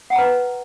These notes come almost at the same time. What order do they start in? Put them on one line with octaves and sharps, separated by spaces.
F#5 A5 A#5 B4